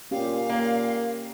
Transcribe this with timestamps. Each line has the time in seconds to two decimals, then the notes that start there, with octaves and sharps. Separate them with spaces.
0.11 A#2 C#4 G4 F5
0.50 A#3